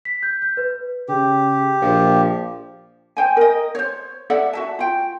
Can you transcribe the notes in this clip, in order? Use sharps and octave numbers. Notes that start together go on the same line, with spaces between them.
B6
G6
G6
B4
C#3 G4
A#1 F3
C5 G5 G#5
A#4 D#5
C5 C#5
A4 D5 E5 F#5
F#4 E5 A5
F4 G5